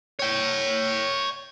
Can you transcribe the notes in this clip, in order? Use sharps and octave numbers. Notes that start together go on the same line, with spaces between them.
C#5 G5